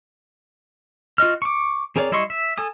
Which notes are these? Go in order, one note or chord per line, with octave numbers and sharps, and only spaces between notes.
F4 F#4 D#5 F6
C#6 D6
C4 G#4 A#4 C#5 D5
G3 E4 D#5 C6 C#6
E5
A4 G#5 D#6